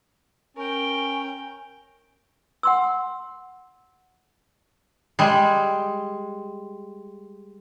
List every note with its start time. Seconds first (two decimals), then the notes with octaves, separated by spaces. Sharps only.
0.57 C#4 A#4 G5
2.63 F#5 C6 E6
5.19 G3 G#3